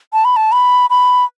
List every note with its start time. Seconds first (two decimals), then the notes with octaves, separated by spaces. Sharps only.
0.13 A5
0.25 B5
0.36 A5
0.52 B5
0.90 B5